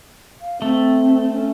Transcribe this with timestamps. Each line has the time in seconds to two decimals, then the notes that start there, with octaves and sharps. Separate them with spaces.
0.41 F5
0.62 A3 C4
1.33 C#4